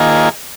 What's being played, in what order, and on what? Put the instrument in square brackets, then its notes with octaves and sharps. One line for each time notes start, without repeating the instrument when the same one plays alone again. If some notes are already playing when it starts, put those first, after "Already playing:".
Already playing: [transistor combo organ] D#3 A#3 F4 G#4